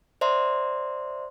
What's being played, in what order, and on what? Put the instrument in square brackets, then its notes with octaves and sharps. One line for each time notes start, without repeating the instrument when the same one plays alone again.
[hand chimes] C5 D5 E5 A#5 C6